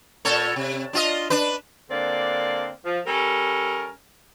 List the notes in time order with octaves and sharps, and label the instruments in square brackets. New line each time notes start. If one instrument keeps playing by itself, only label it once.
[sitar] A#2 A4 C#5
C3
D4 F4 D#5
D4 B4
[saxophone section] D3 A#3 C4 D4 D5
F3
G3 C#4 A4 A#4